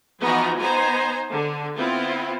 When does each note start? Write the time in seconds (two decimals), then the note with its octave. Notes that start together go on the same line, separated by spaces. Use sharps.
0.22 E3 F3 B3 D#4 F#4 A#5
0.60 B3 D#4 C5 G#5 A#5
1.32 D3
1.76 B3 C4 E4 F4